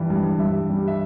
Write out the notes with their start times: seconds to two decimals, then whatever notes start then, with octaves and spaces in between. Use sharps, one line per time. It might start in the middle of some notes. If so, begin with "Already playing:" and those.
Already playing: G2 E3 G3
0.10 G2
0.39 G2 E5
0.69 G3
0.88 E5